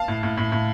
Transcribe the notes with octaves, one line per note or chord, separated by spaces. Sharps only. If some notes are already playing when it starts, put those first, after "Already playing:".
Already playing: F5 A5
A2
A2
A2
A2